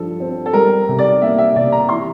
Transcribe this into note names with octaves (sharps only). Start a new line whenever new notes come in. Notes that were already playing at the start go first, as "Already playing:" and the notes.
Already playing: G2 F3 A4
C4
A4
G3 A#4
C3
D5
A#3 E5
E5
C3 D5
A#5
E3 C6